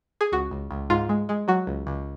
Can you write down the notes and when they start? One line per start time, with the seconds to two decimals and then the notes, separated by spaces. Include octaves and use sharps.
0.21 G#4
0.32 C#2 F#4
0.51 C#2
0.71 C#2
0.90 G#2 F4
1.09 G#3
1.29 G#3
1.48 F#3 F#4
1.67 C#2
1.87 C#2